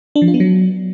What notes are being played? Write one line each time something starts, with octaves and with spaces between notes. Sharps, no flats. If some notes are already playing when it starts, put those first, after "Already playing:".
D4
F3
F4
B3
F#3